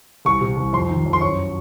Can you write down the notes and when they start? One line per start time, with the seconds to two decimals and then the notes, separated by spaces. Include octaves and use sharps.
0.25 C2 C#6
0.41 C3
0.57 C2
0.73 F2 C6
0.89 D#3
1.06 F2
1.13 C6
1.21 F#2 C#6